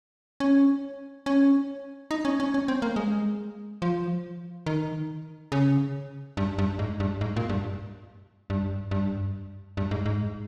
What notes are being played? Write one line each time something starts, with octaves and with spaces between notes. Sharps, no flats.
C#4
C#4
D#4
C#4
C#4
C#4
C4
A#3
G#3
F3
D#3
C#3
G2
G2
G#2
G2
G#2
A#2
G2
G2
G2
G2
G#2
G#2